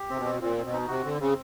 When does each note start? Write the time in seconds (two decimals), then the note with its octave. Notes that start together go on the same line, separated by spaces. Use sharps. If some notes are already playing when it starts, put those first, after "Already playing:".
Already playing: G4
0.10 C3 C4
0.17 B2
0.25 C4
0.41 A#2 C4
0.56 C4
0.65 B2
0.73 D#4
0.88 C3 F#4
1.04 D3 C4
1.20 C#3 C4